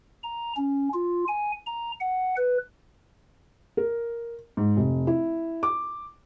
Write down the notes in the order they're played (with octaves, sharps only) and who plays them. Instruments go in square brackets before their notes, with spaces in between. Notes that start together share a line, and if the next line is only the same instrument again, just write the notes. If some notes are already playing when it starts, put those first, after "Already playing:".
[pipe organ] A#5
C#4
F4
G#5
A#5
F#5
B4
[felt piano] A#4
G#2
F1
E4
D6